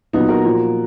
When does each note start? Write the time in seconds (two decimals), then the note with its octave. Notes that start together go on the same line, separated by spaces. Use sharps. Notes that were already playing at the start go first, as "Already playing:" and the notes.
0.13 A#2 F#3 B3 D#4
0.29 F#4 A#4
0.44 A#2 F3